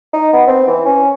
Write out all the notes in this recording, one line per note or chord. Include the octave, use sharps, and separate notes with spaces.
D#4
B3
C4
E3
C#4